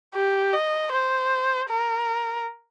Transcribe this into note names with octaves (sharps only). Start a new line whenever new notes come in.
G4
D#5
C5
A#4